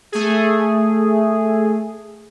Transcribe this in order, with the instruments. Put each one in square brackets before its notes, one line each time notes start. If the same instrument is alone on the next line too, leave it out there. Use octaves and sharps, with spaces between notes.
[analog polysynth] A3 G#4